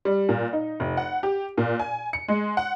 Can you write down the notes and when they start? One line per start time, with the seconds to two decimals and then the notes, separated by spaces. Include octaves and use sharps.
0.05 G3
0.29 A#2
0.53 D#4
0.80 F1
0.97 F#5
1.23 G4
1.58 A#2
1.80 G#5
2.13 C#7
2.28 G#3
2.57 F#5